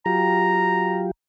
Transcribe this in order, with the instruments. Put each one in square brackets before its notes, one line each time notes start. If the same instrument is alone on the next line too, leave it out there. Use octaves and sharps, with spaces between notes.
[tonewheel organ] F#3 F4 G4 [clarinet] A#5